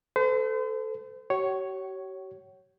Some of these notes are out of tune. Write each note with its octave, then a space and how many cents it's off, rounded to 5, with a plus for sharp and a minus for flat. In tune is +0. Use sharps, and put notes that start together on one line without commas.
A4 +0 C5 -40
G4 -45 C#5 +0 F#5 +40